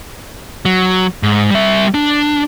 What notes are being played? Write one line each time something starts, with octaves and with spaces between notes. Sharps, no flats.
F#3
G#2
G3 E5
D4